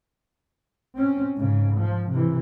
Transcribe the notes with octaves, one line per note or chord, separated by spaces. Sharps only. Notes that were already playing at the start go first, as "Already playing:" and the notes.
C4 C#4
G#2 C#3
F3
C3 E3